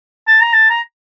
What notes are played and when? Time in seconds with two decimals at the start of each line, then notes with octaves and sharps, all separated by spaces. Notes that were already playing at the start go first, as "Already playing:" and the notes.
0.28 A5
0.41 A#5
0.53 A5
0.70 A#5